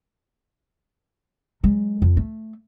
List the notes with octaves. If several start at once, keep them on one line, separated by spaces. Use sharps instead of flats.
F#3 G#3
F2
A3